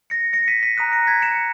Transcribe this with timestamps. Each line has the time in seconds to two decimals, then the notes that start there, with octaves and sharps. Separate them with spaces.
0.10 A#6 C#7
0.33 A#6 C#7
0.48 B6 D#7
0.63 B6 D#7
0.77 A#5 D#6 F#6 B6 D#7
0.92 A#6 C#7
1.07 G#6 B6
1.22 C#7 E7